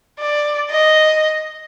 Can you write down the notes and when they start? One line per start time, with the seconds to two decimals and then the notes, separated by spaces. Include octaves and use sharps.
0.19 D5
0.70 D#5